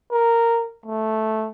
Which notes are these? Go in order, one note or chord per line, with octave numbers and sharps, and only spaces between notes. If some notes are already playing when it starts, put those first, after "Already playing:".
A#4
A3